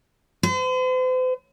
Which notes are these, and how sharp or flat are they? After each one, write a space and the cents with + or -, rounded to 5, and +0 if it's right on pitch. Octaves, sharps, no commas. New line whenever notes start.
C5 -45